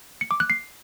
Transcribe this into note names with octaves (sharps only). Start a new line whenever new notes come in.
C#7
D6
F#6
C7